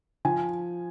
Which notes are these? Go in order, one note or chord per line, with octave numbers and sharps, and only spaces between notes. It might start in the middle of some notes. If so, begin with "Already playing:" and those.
F3 G#5